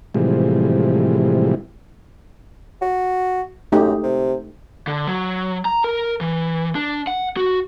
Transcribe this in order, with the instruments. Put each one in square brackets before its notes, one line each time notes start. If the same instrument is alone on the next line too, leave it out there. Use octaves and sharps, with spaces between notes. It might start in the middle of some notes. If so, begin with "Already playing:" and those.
[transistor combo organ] A2 C3 E3 F3 G3 G#3
[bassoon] F#4
[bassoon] F#2 [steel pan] A3 D#4 G4
[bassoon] C3
[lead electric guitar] D3
F#3
A#5
A#4
E3
D4
F#5
F#4